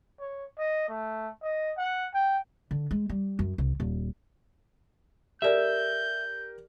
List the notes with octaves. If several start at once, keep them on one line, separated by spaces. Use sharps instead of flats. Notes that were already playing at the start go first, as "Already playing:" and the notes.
C#5
D#5
A3
D#5
F#5
G5
D3
G#3
G3
F#2
C2
D#1
G4 A4 A#4 D5 E5 E6 G6